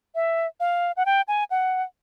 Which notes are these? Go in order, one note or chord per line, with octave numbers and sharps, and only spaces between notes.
E5
F5
F#5
G5
G#5
F#5